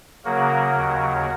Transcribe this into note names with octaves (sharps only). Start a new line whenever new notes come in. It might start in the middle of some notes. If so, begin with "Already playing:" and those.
C#3 F#3 A#3 F#4 A#4
D#2 C#3 F#3